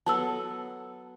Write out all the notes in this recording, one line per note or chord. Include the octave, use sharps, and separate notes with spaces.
F#3 B3 A4 A5 E6